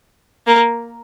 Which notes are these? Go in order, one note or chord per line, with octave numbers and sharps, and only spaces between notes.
A#3